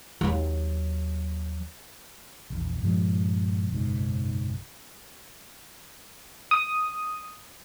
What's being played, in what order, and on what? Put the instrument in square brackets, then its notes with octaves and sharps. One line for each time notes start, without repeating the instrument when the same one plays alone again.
[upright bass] D#2 F#3
[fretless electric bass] A#1 E2
G2 A#2 F3 G#3
F#1 B1 G#2
[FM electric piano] D#6